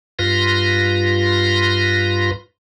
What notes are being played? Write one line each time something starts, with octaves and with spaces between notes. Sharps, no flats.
G2 F4 B4 C6 A#6